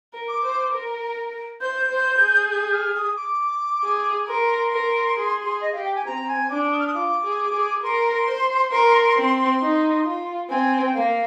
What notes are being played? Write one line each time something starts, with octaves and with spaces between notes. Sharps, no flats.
A#4
D6
C5
A#4
C5 G6
C5
G#4
G6
F6
D#6
D6
G#4
A#4 C6
A#4
G#4
G#4
D#5
G4 F5
G5
G#5
C4 A#5
G#5
D4 D6
D#6
F6
D#6
F4 D6
G#4
G#4
A#4 C6
C5
A#4
C4
D#4
F4
C4 G#5
G5
A#3 F5